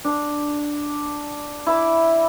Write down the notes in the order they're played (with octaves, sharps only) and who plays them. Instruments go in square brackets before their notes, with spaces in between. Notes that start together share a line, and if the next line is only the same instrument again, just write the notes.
[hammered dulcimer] D4
E4 D6